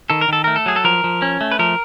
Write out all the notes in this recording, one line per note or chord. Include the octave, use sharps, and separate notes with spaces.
D#3 A4
A#4
D#3 A4
A3 A#4
A4
F#3 G#4
A4
F3 A#4
F3
C#4
A3
B4
F3 A#4